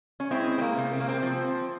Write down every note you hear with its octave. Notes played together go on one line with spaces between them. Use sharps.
C#4
G#3 C4 E4
C4
A#3
C3
C4
A#3
C4
F3